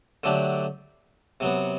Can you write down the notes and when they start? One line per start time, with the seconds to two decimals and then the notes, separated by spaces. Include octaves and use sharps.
0.23 D3 F#3 A3 D4 G4
1.40 C3 F#3 B3